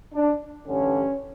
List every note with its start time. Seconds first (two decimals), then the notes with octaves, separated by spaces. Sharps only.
0.14 D4
0.66 A1 G2 D3 C#4